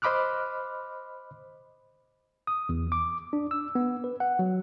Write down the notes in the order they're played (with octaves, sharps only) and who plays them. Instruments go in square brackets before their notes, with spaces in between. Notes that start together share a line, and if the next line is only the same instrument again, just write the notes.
[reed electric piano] C5 D#5 B5 D6 F6 F#6
[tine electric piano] D#6
E2
D6
D4
E6
B3
B4
F#5
F#3